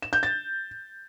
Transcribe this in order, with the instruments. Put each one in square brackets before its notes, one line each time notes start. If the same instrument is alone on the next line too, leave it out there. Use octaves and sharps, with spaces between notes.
[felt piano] E7
G6
A6